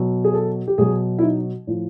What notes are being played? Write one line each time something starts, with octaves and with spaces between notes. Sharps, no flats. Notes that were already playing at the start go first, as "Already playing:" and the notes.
Already playing: B2 F#3
G#4
A4
G4
B2 F#3 G#4
E4
D#4
A2 F3